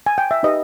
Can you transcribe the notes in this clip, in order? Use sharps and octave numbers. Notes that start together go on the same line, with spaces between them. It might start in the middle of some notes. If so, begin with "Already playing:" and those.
G#5
G5
E5
D#4 G4 B4 D#5